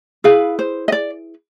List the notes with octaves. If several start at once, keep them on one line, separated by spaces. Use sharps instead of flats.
E4 G#4 B4 F5
C5
D#5
D5